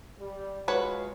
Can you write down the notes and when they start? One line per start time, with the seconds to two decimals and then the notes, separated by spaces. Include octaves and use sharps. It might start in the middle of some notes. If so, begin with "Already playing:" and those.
0.19 G3
0.68 G#3 F4 F#4 B4 C#5